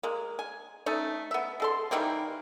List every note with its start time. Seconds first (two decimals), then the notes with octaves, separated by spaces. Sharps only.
0.03 G#3 A#3
0.39 G#5
0.86 A3 C#4 D#4
1.31 B3 E5
1.60 G#3 A4 C6
1.91 D#3 E3 G3 A#3